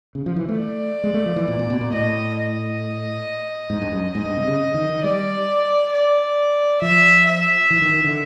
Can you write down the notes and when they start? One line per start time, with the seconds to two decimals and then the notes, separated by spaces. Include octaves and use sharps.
0.15 C#3
0.26 F3
0.36 E3
0.49 A3
0.58 D5
1.04 G#3
1.14 A3
1.26 F3
1.36 E3
1.48 A#2
1.59 A#2
1.70 B2
1.81 A#2
1.93 A2 D#5
2.37 D#5
3.70 G#2
3.82 G2
3.92 F#2
4.14 G#2 D#5
4.25 G2
4.37 C3
4.48 C#3
4.74 D#3
4.90 D#3
5.03 G3 D5
5.92 D5
6.82 F3 E5
7.27 E5
7.70 E3
7.82 D#3
7.94 D#3
8.04 D3